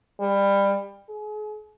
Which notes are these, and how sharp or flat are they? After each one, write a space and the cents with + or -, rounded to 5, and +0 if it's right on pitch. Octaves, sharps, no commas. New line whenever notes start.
G3 +20
G#4 +35